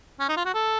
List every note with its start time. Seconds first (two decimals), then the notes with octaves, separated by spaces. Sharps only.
0.20 C#4
0.29 D#4
0.37 F4
0.45 F#4
0.54 A4